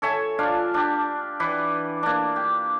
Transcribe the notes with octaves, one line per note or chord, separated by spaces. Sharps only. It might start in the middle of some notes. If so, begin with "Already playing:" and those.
A4 C#5 E5 G#5
D4 F4 D5 F5
D4 G4
E3 B4 D5
A#3 D4
G4